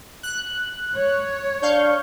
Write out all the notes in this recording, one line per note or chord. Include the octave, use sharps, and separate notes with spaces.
F#6
C#5
D4 F5 C#6 G6